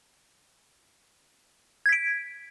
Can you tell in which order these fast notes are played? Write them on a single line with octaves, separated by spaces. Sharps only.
G#6 B6 D7